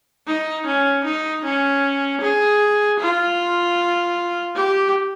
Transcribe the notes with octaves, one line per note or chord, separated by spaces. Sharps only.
D#4
C#4
D#4
C#4
G#4
F4
G4